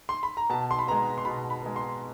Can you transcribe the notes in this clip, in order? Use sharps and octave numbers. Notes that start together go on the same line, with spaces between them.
C6
B5
A#5
B2 A5
C6
B5
G#3 B3 A#5
C6
B2 B5
B5
G#3 B3
C6